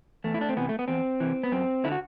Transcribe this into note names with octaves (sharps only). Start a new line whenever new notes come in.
E2 A3
E4
D4
C4
C3 E3 B3
A3
B3
E2 C4
C3 E3
B3
F#2 C4
D3 E4
F#4